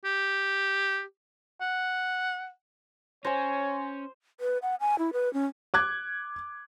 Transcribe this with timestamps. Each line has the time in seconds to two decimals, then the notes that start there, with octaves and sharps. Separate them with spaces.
0.05 G4
1.61 F#5
3.25 C#4 C5 C#5 G#5 A#6
4.40 B4
4.62 F#5
4.80 G#5
4.98 E4
5.13 B4
5.33 C#4
5.74 D6 F#6 G#6